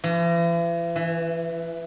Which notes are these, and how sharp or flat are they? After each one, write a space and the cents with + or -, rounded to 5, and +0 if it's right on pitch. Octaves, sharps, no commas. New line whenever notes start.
E3 +45
E3 +10